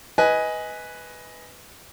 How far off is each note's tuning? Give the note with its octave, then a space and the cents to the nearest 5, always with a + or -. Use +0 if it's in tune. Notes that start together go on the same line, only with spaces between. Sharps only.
B4 +0 D#5 +15 G#5 +0